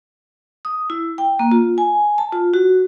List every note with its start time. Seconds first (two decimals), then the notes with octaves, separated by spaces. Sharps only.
0.65 D#6
0.90 E4
1.18 G5
1.39 A#3
1.52 F4
1.78 G#5
2.18 A5
2.33 F4
2.54 F#4